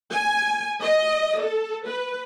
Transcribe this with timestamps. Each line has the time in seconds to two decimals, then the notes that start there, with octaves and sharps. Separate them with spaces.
0.10 G#5
0.82 D#5
1.40 A4
1.87 B4